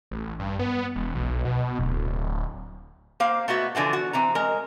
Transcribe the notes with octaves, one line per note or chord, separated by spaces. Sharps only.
A1
G2
B3
E1
B1
B2
D1
A#3 C5 F5
A3 B3 F#4 E5
D3 E3 F3 B3
F#4
E3 C4 A#5
G#3 A#4